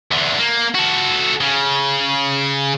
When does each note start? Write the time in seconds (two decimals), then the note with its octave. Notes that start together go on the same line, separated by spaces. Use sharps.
0.11 E2 D3
0.39 A#3
0.75 F#4 A4
1.41 C#3